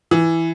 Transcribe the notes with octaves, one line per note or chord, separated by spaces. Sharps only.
E3